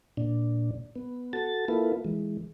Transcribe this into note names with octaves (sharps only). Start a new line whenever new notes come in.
A#2 D4
B3
F#4 A4 A6
A#3 E4 F4 A4 B4
E3 G#3